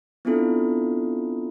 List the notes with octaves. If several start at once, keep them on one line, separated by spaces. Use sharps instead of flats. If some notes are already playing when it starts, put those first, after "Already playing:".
B3 C4 D4 E4 F4 A4